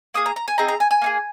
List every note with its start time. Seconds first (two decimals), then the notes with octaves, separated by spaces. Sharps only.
0.14 A#3 G#4 D#6
0.26 A#5
0.36 A#5
0.48 G#5
0.58 C4 D#4 G#4 A#5
0.68 A#5
0.80 G#5
0.91 G#5
1.01 A#3 D#4 G#4